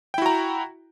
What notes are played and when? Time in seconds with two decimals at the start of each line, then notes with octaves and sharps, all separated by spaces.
0.14 G5
0.18 E4
0.22 F#4
0.26 A#5